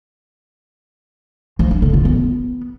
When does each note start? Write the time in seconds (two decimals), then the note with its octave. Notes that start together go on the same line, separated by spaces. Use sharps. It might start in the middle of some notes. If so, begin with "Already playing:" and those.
1.59 F3
1.71 D4
1.82 D3
1.94 F4
2.05 B3